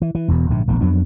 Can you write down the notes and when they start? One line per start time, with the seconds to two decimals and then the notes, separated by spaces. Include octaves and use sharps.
0.02 E3
0.15 E3
0.28 E1 E2 B2
0.50 A#1 G#2 D3
0.67 E1 A#1 D#3 A#3
0.81 F2 F#3 B3 D4